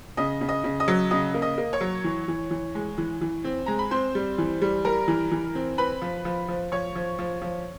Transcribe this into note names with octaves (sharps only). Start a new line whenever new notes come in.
C#3 D#5 D#6
C#3
D#5 D#6
C#3
D#5 D#6
F#3
C#3 D#5 D#6
A#3
D#5 D#6
A#3
C#5 C#6
F#3
E3
E3
E3
G#3
E3
E3
C4
G#3 A#5
B5
C4 C5 C6
G3
E3
G3
G3 A#4 A#5
E3
E3
C4
C4 B4 B5
F3
F3
F3
F3 C#5 C#6
F3
F3
F3